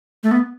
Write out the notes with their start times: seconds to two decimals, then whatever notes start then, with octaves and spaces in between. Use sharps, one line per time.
0.23 A3
0.31 B3